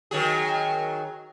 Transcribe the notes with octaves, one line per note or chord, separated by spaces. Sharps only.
D#3 F#3 G#4